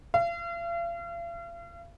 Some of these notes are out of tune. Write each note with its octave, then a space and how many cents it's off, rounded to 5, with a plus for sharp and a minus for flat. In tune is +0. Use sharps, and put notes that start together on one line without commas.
F5 -40